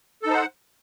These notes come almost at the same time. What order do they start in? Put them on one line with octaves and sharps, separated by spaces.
A4 D#4 C5 F#5